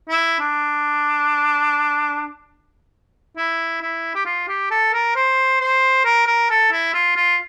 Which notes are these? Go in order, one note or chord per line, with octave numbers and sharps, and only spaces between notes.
E4
D4
E4
E4
G4
F4
G4
A4
A#4
C5
C5
A#4
A#4
A4
E4
F4
F4